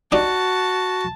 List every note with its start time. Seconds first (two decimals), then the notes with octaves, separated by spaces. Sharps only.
0.12 D4 D#4 F#4 G4 A5